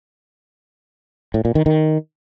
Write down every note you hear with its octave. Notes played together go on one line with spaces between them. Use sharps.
A2
A#2
D#3
D#3